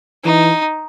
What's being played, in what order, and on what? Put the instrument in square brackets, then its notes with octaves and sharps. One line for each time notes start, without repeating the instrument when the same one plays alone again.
[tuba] E3 [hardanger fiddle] D#4